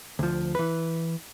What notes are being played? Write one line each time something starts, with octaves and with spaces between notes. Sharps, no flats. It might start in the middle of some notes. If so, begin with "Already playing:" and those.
D2 F3
E3 B4